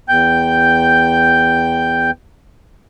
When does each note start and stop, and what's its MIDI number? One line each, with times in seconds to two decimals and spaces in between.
0.09 2.11 40
0.09 2.11 79
0.09 2.11 91